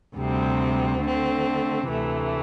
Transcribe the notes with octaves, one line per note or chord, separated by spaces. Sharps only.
D2 C3 G3 C4
D3 A3 C4
D2 C3 E3 A3